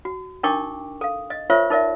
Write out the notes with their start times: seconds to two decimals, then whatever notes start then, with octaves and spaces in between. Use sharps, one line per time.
0.05 F#4
0.43 D4 D#4 A#4 G5 C#6 D6
1.01 A4 F5
1.30 D#5
1.50 F4 A#4 C5 C#5 E5 C#6
1.70 D#4 A#4 D5 E5